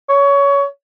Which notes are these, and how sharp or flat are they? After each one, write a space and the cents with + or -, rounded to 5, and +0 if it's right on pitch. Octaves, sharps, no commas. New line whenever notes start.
C#5 +20